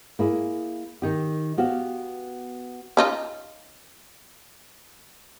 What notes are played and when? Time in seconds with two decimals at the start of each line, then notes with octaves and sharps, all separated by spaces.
0.19 A#3 E4 G#4
1.02 D#3 D#4 G4
1.58 B3 F#4 G4 F5
2.97 C#4 D#4 F4